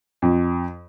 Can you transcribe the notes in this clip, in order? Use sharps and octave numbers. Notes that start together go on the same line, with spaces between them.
F2